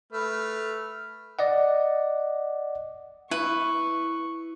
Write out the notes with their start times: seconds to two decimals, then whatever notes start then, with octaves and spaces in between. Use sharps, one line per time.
0.13 A3 B4 F6
1.39 D5 D#5 F#5
3.31 E4 B4 C#6